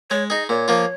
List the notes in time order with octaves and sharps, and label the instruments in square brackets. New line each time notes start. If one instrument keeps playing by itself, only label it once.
[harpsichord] G#3 [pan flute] C#5
[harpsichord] D#4 G#4 [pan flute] D#5
[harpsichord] A#2 [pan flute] C#5
[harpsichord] F3 A#3 F4